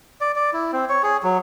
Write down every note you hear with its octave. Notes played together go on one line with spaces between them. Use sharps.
D5
D5
E4
C4
C#5
G#4
F#3